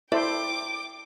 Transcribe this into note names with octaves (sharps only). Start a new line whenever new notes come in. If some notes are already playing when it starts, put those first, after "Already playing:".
E4 A4 C5 D5 E5 G5 D6